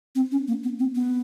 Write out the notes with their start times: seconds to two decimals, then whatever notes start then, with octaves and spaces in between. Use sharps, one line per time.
0.15 C4
0.32 C#4
0.48 A#3
0.64 B3
0.79 C4
0.95 B3